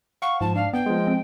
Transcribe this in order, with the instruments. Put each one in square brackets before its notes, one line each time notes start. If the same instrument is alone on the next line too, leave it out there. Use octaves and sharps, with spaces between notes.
[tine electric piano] F5 F#5 [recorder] C#6
[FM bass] G#2 [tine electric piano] F3 [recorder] A5
[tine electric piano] D4 [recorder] F5
[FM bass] B3 [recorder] G5
[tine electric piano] F3 G#3
[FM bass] C4